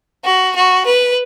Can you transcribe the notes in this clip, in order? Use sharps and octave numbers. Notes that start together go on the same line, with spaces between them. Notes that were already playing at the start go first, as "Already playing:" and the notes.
F#4
F#4
B4